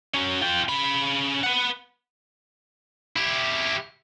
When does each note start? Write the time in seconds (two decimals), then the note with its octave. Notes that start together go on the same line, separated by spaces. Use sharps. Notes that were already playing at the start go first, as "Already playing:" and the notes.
0.14 F#3 C#4
0.41 F4 G5
0.69 C#3 B5
1.43 B4 F#5
3.17 E4 G4